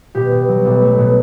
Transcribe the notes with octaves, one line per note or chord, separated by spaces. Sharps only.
B2 G4
B2
F#3
B1
A3
B2